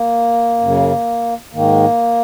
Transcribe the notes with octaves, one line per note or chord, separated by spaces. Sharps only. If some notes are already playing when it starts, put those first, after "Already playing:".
Already playing: A#3
F#2 C#3
G#2 D#3 A#3